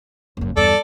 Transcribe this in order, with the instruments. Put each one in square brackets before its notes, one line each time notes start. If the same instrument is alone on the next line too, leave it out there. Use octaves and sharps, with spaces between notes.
[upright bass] F#1 F#2
[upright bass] E2 G2 [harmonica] A4 D5